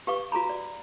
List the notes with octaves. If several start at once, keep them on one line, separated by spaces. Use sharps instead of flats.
G4 B4 F5 C#6 D6
F#4 G#4 A#5 B5
D5